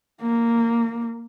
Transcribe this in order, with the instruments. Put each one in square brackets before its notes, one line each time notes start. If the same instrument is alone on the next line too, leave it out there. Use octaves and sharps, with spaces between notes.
[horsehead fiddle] A#3